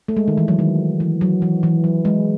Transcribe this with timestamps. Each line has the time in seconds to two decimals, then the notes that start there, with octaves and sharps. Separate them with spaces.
0.08 A3
0.16 G#3
0.28 D#3
0.38 E3
0.48 F#3
0.59 D#3
1.00 E3
1.21 F#3
1.42 E3
1.63 E3
1.84 F#3
2.05 G#3